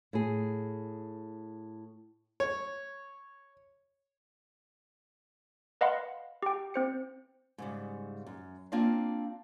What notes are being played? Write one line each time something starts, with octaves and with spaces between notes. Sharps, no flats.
A2 G#4
C#5
B4 D#5 F5 F#5 B5 C6
G4 G5
C4 C5 C#7
G#2 C#3 G3
F#2
A#3 C4 D4 F4 D#5 F5